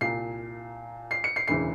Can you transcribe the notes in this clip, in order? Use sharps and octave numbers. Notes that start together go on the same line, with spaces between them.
C2 A#2 C7
C7
C#7
C7
E1 D2 C#3 E3 C7